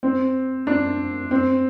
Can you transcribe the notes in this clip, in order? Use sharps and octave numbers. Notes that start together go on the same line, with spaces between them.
C4
D4
C4